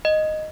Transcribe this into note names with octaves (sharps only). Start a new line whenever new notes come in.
D#5